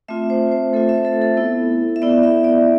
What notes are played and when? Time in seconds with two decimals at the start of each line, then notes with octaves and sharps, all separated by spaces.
0.08 A3 C4 F4 E5
0.30 C5
0.52 C5
0.73 A3 C4 F4 A4
0.89 E5
1.05 A4
1.21 A4
1.37 B3 E4
1.96 E5
2.02 B3 E4 D5
2.23 E5
2.44 D5